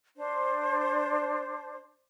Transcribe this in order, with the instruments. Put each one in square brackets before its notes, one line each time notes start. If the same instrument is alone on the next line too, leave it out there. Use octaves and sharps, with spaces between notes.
[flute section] D4 C5